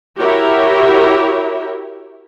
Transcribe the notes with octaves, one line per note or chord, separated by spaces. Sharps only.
E4 F#4 G4 A#4 C#5 E5